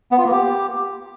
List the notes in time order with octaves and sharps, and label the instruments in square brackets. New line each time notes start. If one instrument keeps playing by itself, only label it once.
[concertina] B3
F4
A#3
G4